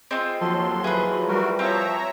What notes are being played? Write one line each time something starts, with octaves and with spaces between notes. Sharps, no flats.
G#3 C4 D#4 F4
D#2 F3 F#3 A4 C6
E3 G#4 B4
G3 A3 F#4 A#4
F3 C4 C#5 E5 A#5